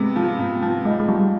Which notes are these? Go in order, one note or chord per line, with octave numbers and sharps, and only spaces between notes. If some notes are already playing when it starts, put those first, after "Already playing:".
Already playing: C3 G#3 B3
F3
C3 B3
F3 G#3
G#3 D#4
G#3
F3 G3